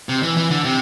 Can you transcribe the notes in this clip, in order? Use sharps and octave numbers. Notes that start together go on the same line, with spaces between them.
C3
E3
E3
D3
C3